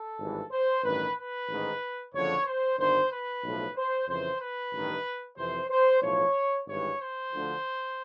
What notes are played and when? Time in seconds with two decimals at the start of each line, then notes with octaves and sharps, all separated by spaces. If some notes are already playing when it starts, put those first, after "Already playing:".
Already playing: A4
0.19 G#1 G2 E3
0.51 C5
0.83 A1 G2 D#3 B4
1.17 B4
1.48 A1 G#2 D#3
2.13 F#1 F2 D3 F3 C#5
2.45 C5
2.78 G1 G2 D#3 C5
3.11 B4
3.43 B1 A2 F3
3.76 C5
4.08 F2 C#3 E3 C5
4.40 B4
4.72 A1 G2 D#3
5.37 F2 C3 E3 C5
5.70 C5
6.02 B1 A2 F3 C#5
6.67 G#1 G2 E3 C#5
6.99 C5
7.32 D2 D3 F3